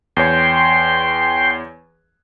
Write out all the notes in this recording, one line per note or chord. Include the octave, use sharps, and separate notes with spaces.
E2 C#5 G5 C6